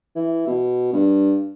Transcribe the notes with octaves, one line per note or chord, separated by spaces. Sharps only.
E3
B2
G2